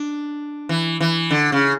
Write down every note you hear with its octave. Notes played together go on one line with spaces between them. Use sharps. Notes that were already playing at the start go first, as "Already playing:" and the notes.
Already playing: D4
E3
E3
D3
C#3